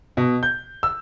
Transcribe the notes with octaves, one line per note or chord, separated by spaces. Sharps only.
B2
G6
E6